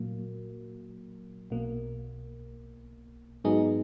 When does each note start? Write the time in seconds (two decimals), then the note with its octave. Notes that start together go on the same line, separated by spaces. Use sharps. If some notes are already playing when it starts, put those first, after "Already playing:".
Already playing: A#2 F#3 A#3
1.50 B1 B2 A#3
3.44 G#2 F#3 B3 D#4 G#4